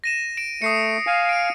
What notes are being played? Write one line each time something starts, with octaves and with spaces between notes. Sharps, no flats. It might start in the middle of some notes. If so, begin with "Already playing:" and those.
A#6 D#7 E7
D7 E7
A3 D#6 C7 C#7
F5 G#5
D7 D#7